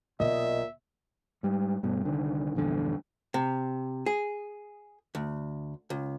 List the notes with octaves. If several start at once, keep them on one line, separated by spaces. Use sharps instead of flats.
B1 A#2 D#5 E5
G#2 G3
G2 B2 A3
C2 D3 D#3
A#1 E2 G2 D3
C3
G#4
D2
C#2